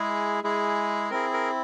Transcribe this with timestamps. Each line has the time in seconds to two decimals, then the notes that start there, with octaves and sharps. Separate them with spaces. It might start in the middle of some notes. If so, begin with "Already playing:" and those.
Already playing: G#3 E4 G#4
0.44 G#3 E4 G#4
1.10 C4 E4 G#4 A#4
1.33 A#4